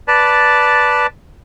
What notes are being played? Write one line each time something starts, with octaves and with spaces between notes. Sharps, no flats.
B4 D5 A5